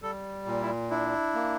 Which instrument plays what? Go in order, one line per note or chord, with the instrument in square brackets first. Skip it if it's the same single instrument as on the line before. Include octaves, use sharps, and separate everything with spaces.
[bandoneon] G3 [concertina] A4
[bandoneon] A#2
[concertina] E4
[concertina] D4 [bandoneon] E4
[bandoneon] A#3